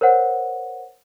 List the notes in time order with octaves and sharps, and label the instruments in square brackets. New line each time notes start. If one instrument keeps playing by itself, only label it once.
[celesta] A#4 C5 C#5 F#5